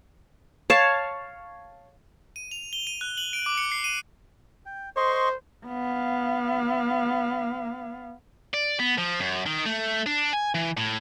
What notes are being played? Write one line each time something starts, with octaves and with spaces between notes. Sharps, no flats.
C#5 F5 A5
D#7
F7
G7
D#7
F#6
F#7
D7
D6
C#7
C7
D#7
G5
C5 D#5 C6 C#6
B3 F5
D5
B3
F3
F#2
D#3
A3
D4
G#5
E3
A2